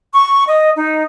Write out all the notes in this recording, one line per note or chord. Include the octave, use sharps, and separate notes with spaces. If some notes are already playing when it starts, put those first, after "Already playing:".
C#6
D#5
D#4